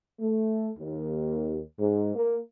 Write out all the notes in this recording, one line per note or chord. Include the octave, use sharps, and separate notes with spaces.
A3
D#2
G#2
A#3